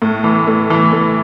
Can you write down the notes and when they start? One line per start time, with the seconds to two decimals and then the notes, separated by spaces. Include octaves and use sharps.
0.02 A2
0.24 E3
0.47 A3
0.70 E3
0.92 A3